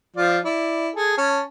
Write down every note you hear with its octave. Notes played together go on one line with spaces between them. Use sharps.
F3 F4 D5
E4 D5
G#4 A4
C#4 A5